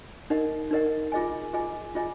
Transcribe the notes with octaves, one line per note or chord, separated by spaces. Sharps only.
D#4 A#4 D#5 F#5
D#4 A#4 D#5 F#5
F4 G#4 D#5 G#5
F4 G#4 D#5 G#5
F4 G#4 D#5 G#5